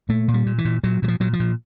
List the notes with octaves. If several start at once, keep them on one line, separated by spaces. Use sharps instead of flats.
A#2 A3
A#2
G3
A#2
E3
A#2
A#2 F#3
A#2 F#3
F3
A#2 F#3
F3
A#2